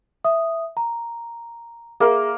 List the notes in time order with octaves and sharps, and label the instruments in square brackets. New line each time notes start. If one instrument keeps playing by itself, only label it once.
[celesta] E5 D#6
A#5
[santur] A#3 A#4 [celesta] G#4 E5